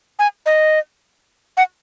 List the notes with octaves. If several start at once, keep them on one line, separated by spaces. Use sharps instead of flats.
G#5
D#5
F#5